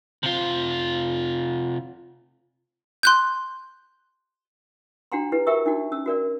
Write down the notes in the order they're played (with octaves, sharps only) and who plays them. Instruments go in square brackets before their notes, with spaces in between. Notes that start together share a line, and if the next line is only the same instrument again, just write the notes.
[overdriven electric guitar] C3 F4
[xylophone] C6 F#6 G6
[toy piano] D4 F#4 F#5 G5 A#5 C6
E4 G4 B4
F#4 A#4 E5 G5 C#6 E6
D4 D#4 F#4
C#4 E6
F#4 A#4 D5